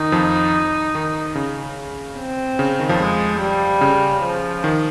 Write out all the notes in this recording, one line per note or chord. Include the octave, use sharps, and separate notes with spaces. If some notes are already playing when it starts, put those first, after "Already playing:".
Already playing: D#3 D#4
F2 F3
D#3
C#3
C4
C#3
D#3
F2 F3
G#3
G3
C#3
F3
D#3